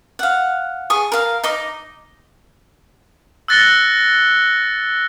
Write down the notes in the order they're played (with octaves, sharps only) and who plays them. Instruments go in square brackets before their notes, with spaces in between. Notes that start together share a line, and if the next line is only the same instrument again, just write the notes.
[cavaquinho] F5 F#5
G#4 C#6 D#6
A#4 F5
D#4 D#5 D6
[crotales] E6 F#6 A6 A#6 C#7 G7